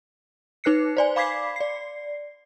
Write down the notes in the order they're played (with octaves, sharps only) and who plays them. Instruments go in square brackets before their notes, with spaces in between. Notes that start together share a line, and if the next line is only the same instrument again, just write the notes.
[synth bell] D#4 B4 F#6 C7 C#7
C5 D5 G#5
F5 B5 D6 G#6 B6 C7
D5 C7